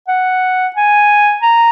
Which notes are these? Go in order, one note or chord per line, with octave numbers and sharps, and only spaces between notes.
F#5
G#5
A#5